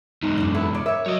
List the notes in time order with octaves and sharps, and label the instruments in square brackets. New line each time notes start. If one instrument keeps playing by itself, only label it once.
[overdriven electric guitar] E2 G#2 [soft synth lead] D#4
[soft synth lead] F#2 [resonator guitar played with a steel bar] A#3 D4
[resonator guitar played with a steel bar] B3 E4 A4
[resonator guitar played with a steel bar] C#3 C#5 D5 [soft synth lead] D6
[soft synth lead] A#4 [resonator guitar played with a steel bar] C#5 E5
[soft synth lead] F#3 [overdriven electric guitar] C#5 D#5